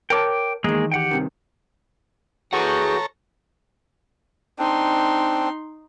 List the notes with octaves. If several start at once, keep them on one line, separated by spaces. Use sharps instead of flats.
A#4 C#5 G5 A5 D6
E2 D#3 G#3 A#3 G#4
G4 F#5 G5
G2 C3 D#3
E3 F#4 G#4 A4 C#5 F#5 A#5
C4 D4 D#4 C6